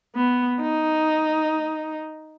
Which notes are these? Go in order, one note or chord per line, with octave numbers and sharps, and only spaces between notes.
B3
D#4